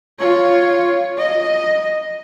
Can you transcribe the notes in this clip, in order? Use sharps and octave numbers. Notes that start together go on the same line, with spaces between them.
F4 C#5
D#5